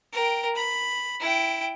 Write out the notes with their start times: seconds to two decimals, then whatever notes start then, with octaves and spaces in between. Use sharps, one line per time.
0.12 A#4 G5
0.55 B5
1.20 E4 G5